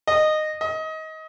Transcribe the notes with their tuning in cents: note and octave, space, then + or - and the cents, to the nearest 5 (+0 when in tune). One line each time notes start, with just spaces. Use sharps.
D#5 -15
D#5 +25